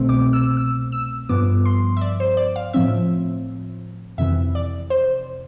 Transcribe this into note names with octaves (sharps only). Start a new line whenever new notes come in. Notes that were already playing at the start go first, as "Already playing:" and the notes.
Already playing: C2 B2 A3 C4
D6
E6
E6
E6
G2 F3 B3 D6
C6
E5
D5
C5
D5
F5
A2 F3 C4 E5
F2 C3 E3 E5
D5
C5